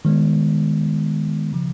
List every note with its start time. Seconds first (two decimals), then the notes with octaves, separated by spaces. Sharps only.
0.05 D#3 G#3 B3
1.53 C#3 F3